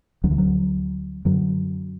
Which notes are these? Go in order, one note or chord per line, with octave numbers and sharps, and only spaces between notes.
D2 D3 F#3
E3
F#3
F#2 D3 F#3